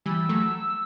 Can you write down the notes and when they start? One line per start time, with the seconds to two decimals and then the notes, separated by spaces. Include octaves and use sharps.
0.06 E3 G3 E6
0.29 F#3 A3